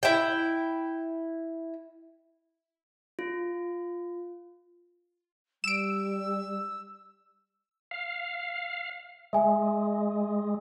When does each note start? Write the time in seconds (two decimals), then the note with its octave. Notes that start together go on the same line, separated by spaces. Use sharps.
0.03 E4 G5
3.19 F4
5.64 G3 E6 D7 E7
7.91 F5
9.33 G#3 E5 G#5